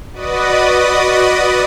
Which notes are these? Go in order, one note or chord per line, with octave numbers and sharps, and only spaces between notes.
F#4 B4 D5 D#5 D#6